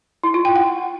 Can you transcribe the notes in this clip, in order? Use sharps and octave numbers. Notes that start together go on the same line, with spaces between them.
E4
F4
G5
F#5